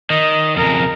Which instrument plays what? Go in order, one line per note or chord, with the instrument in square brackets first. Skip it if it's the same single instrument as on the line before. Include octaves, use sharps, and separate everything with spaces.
[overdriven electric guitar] D#3 [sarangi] D#5
[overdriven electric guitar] F2 C#3 [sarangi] A#4